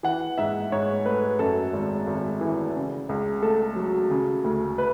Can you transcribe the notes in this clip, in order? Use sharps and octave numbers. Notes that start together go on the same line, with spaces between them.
E3 F#5
G#2 E5
G#2 C#5
A3 B4
F#2 A4
G#1
G#1
E3
C#3
C#2
A3 A4
F#3
C#3
D2
B4